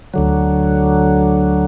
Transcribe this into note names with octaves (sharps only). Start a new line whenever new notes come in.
D2 D3 F#3